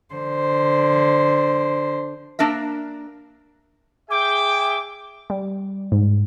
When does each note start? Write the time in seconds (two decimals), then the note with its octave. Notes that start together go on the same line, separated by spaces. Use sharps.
0.14 D3 C5
2.39 A#3 D4 A#4 E5
4.11 G#4 E5 G5 D6
5.30 G3
5.92 G#2